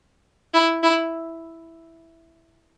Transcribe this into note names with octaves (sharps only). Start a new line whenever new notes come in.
E4
E4